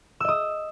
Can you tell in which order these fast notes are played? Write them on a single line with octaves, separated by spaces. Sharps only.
E6 D#5 D#6